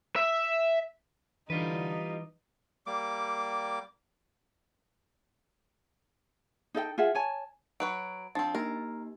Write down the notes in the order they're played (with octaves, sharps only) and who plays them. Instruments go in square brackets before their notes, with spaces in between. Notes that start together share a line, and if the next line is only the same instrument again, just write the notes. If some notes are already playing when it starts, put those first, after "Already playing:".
[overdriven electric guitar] E5
[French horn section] D3 [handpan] E3 [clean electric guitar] G3 F4 B4 [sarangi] D#4
[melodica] G3 A#3 D6
[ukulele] D#4 A4 E5 G5
F4 G#4 E5 F#5
C#5 G#5 A5
[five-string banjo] F#3 B4 C#5 [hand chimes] D7
[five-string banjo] F3 C4 [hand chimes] D4 A6
[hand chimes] A#3 D#4 G4 [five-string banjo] A#4